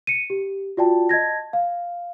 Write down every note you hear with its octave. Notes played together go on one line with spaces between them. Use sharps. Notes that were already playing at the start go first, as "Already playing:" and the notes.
C#7 D#7
G4
F4 F#4 D5 G5 A5
D#5 A5 G#6 A#6
F5